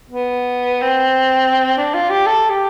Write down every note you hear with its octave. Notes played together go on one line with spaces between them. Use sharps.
B3
C4
D4
F4
G4
A4
G4